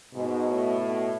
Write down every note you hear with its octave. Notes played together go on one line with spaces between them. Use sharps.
G#2 B2
A2
B2